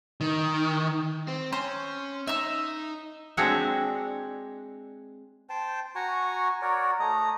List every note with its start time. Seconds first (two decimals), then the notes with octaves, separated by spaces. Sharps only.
0.21 D#3
1.28 C4
1.53 C#4 C5
2.27 D#4 E5 E6
3.37 G#3 C4 D4 F#4 C#5 E5
5.50 C5 G5 A5
5.95 F#4 G#5 A#5 C#6
6.62 F#4 A#4 C#5 D5
6.99 A3 D#5 A#5